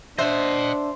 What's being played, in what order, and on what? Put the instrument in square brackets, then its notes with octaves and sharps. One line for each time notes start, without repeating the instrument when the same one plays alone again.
[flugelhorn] D4 [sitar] C5 [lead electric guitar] D#5 F#5 [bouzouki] E5